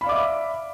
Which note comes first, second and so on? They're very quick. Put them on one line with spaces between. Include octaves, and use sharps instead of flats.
B5 F5 D5 D6 E5